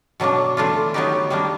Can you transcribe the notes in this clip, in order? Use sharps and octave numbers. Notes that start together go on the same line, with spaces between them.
B2 F#3 A#3 D4
E3 A3 D4 F4
D#3 F#3 B3 D#4 G4
D#3 G3 A#3 D4